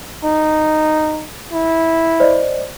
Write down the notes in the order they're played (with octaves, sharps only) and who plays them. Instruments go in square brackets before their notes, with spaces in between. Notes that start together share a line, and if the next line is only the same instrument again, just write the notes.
[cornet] D#4
E4
[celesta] C5 D5 D#5